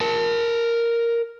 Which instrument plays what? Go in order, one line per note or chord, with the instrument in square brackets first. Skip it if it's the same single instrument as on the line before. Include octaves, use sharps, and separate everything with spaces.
[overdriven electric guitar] A#4 A5